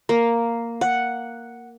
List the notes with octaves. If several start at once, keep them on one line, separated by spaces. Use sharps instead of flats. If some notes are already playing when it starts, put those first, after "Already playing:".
A#3
F#5